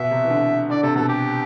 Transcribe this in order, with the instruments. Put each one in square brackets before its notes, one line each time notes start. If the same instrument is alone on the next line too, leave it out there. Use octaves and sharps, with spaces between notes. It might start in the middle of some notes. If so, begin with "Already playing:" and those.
Already playing: [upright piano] B2 [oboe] E5
[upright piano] C3
E3
D3
[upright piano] D3 [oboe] D5
[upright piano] C3 [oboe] A4
[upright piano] B2 [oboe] A4
[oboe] G4